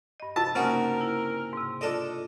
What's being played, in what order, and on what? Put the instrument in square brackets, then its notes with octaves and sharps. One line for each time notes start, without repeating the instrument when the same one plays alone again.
[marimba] G2 D#5
[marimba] C3 A6 [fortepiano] A5
[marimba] C#3 A#3 D#4 [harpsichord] C4 C#4 F#4 [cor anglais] A#4
[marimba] E4
G#2 C3
[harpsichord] D4 A4 D#5 [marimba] F4 D5